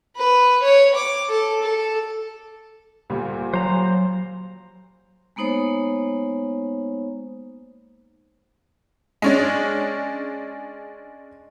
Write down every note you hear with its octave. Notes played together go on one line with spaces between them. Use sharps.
B4
C#5
D6
A4
A4
D2 A#2 G3
F#3 C5 A#5
G#3 A#3 B3 D#4 C5 C#5
G#3 C#4 D4